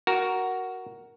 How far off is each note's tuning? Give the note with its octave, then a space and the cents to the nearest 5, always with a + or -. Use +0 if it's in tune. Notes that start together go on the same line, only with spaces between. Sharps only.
F#4 +5 A#4 +0